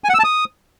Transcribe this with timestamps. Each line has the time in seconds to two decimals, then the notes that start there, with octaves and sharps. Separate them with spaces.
0.04 G#5
0.09 F#5
0.14 E6
0.19 A5
0.24 D#6